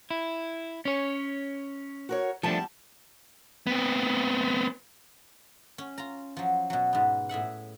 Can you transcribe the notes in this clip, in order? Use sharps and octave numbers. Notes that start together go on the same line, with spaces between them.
E4
C#4 C#5
F#4 A#4 C#5
E2 F3 G3 A3 D4 A5
B3 C4
C#4
F4 A#5
F3 F#3
B2 F#3
G#2 B3
A2 G#4 E5 F#5